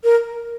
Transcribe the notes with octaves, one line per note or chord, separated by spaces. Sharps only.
A#4